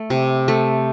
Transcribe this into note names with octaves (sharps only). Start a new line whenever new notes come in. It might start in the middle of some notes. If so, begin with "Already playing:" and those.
Already playing: A3
C3
A3